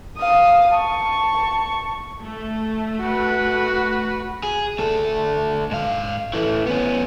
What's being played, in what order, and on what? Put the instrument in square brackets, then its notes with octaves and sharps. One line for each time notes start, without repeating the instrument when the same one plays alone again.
[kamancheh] F5 D#6
A5 C#6
[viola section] A3
[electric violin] F#4 B4
[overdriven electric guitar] G#4
D2 A4
G#2 F5
E3 A3
B3 C#4